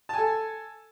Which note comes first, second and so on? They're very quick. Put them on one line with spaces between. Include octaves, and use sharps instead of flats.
A5 G#5 A4